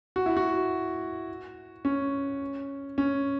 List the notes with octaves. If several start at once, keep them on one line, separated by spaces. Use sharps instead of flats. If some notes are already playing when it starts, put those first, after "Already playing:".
F#4
E4
F#4
C#4
C#4